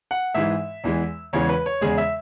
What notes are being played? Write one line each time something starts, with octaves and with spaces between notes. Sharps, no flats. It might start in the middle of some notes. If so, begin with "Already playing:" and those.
F#5
G#2 E3 G#3 E5
E2 E3 G#3
E2 C#3 E3 G#3 C#5
B4
C#5
E2 C#3 G#3 G#4
E5